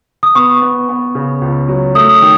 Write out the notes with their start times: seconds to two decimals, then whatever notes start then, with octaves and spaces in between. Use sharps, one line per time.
0.23 D#6
0.35 B3 C#6
0.61 B3
0.89 B3
1.15 C#3
1.41 C#2
1.68 F#3
1.95 A3 D#6
2.22 D#3